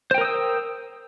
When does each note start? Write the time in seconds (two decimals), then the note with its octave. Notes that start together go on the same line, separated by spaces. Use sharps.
0.11 C5
0.14 G5
0.18 A#4
0.21 D#6
0.25 E6